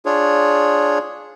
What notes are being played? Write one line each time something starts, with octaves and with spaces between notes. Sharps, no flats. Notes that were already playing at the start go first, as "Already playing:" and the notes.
D4 F4 G#4 C#5